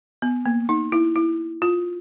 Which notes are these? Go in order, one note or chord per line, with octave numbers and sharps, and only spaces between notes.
B3
A#3
D#4
E4
E4
F4